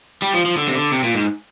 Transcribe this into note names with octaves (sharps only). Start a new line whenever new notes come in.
G3
F3
F3
D3
C3
D3
C3
A#2
G#2